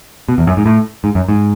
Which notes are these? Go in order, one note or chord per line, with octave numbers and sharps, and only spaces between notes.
B2
E2
F#2
G#2
A2
G#2
F#2
G#2